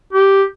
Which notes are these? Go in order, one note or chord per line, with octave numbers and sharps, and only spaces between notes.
G4